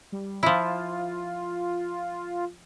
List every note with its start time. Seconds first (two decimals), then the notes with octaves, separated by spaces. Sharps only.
0.12 G3
0.43 F3 E4 F4